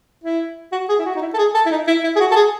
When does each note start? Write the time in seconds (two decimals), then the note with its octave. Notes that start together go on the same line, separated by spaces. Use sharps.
0.24 E4
0.72 F#4
0.89 G#4
0.99 E4
1.05 F#4
1.15 D#4
1.21 E4
1.34 A4
1.38 G#4
1.54 A4
1.66 E4
1.71 D#4
1.87 E4
2.03 E4
2.16 G#4
2.20 F#4
2.31 A4
2.36 G#4